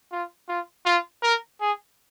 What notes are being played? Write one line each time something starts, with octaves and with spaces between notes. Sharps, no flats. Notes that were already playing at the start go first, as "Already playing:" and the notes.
F4
F4
F4
A#4
G#4